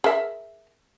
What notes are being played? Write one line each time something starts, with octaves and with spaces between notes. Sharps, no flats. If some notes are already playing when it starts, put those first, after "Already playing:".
G#4 A#4 E5